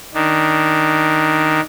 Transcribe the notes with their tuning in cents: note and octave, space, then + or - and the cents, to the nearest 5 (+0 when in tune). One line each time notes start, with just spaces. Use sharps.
D#3 +0 D4 +0